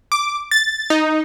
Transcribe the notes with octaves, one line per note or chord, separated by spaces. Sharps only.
D6
A6
D#4